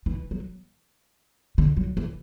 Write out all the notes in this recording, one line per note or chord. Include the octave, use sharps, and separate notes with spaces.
E3
F#3
D3
F#3
E3